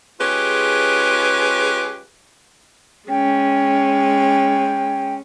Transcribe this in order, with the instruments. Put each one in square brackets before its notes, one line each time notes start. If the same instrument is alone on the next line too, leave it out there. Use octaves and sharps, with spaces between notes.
[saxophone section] G#3 C#4 F4 G4 G#4 B4
[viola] G#3 C#4 [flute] G5